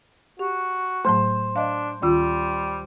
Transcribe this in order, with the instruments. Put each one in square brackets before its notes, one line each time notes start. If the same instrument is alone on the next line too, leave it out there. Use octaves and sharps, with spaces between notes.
[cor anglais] F#4 [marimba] G4
[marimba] A2 F#3 A3 [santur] C5
[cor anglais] D4 [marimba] D#5 F5
[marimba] D2 D#3 F4 [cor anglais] G3